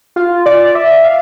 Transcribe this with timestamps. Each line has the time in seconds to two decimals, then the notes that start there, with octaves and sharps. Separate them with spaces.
0.16 F4
0.46 D5
0.75 E5
1.05 F5